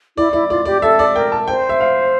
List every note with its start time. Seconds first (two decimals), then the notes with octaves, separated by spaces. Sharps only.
0.17 E4 D5
0.33 E4 D5
0.50 F4 D5
0.65 G4 D5
0.82 A4 E5
0.99 D5
1.15 A#4 G5
1.32 A5
1.48 C5 G5
1.69 E5
1.80 F5